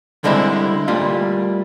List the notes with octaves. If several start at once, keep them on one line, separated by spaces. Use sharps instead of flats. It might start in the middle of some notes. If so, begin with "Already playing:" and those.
D3 G3 G#3 C4 E4
G3 A3 A#3 F4